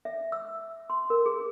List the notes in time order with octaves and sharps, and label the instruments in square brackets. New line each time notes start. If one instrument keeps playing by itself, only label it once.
[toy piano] E5
E6
C6
A#4
G#4